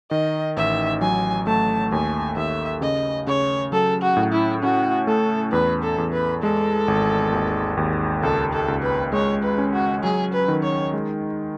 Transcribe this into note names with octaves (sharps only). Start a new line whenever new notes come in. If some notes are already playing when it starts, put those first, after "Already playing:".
D#3 D#5
A1 E5
F#3 G#5
A3 A5
D#2 G#5
D#2 E5
C#3 D#5
C#3 C#5
F#3 A4
F#4
A2
E4
C#4 F#4
A3 A4
E2 B4
A4
E2
B4
G#3 A4
G#1
D#2
D#2
C#2 A4
A4
C#2
B4
G#3 C#5
B4
C#4
F#4
F#3 G#4
B4
D#3
C#5
G#3